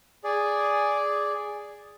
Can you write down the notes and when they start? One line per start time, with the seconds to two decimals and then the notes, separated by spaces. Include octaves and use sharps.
0.24 G#4 D5